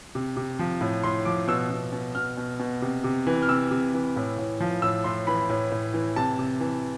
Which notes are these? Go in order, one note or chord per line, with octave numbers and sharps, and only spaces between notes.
C3
C3
F3
A2
A2 C6
F3 D6
B2 E6
B2
B2
B2 F6
B2
B2
C3
C3
E3
F6
C3 E6
C3
E3
A2
A2
F3
A2 E6
A2 C6
E3 B5
A2
A2
E3
C3 A5
C3
E3